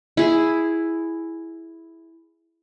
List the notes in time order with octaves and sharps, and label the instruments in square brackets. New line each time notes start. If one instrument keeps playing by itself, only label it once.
[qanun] E4 G#4